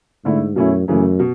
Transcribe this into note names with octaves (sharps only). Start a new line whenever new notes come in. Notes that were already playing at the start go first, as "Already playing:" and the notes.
G#2 D3 A3 E4
F#2 B2 A3 C#4 E4
F#2 C#3 E3 A3
B2